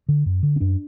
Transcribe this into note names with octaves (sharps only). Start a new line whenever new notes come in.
D3
F#2
D3
C#4
F#2 D4